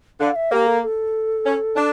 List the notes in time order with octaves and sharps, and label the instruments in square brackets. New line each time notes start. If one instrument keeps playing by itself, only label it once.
[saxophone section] D3 [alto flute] F5
[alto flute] E5
[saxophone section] A#3 [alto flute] G4
[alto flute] A4
A4
[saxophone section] C#4
D4